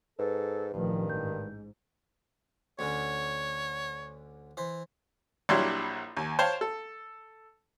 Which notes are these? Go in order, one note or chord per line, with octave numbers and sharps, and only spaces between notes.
G#2 A4 B4
A1 G2 D#3 F3
G#2 G6
D2 D3 C#4 C#5
E3 C5
A#1 F#3 G3 D4 E4 C6
D#2
C5 C#5 F5 G5 A5 C6
A4